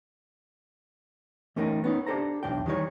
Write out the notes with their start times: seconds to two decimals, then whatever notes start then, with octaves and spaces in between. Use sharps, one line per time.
1.56 E3 A3 C#4 D#4 A#4 G5
1.84 B3 C#4 D#4
2.06 D4 G4 A4 C5 A#5
2.43 B1 E2 A#2 D4 G5
2.66 D#3 E3 G3 A3 D#4 C#5